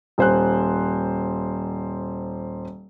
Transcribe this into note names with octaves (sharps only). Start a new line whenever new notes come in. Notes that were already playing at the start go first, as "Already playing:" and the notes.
D#1 C5 F#6